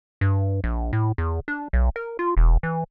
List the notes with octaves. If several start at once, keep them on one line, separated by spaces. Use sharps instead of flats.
G2
A#1
A2
E2
D4
B1
A#4
F4
E1
E3